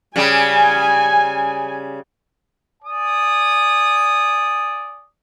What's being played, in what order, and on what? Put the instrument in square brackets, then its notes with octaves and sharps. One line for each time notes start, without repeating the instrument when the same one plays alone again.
[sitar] C#3 G3 [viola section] G#5
[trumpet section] D5 G#5 D#6